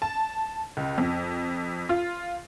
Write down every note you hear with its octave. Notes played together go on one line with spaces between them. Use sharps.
A5
C#2
F2
F4